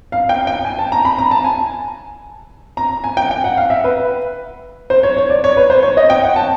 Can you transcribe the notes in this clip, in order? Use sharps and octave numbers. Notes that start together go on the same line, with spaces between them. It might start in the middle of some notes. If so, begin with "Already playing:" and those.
F5
G5
G5
G#5
A5
A#5
B5
A#5
A5
G#5
A#5
G#5
G5
G5
F#5
F5
E5
B4
C5
C#5
C#5
D5
C#5
B4
C5
C#5
D#5
G5
F#5
A5